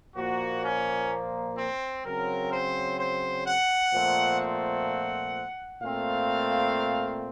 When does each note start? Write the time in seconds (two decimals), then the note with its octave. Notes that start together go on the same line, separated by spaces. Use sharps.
0.16 A#2 F3 A#3 F#4
0.64 C#4
1.58 C4
2.05 C#3 F#3 C4 A#4
2.52 C5
2.99 C5
3.46 F#5
3.94 A#2 F3 A3 C4
4.40 F#5
5.82 A#2 A3 C4 F5